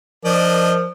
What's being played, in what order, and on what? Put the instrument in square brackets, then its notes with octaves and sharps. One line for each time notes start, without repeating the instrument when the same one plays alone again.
[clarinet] F3 [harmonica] D4 D#5 [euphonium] A#4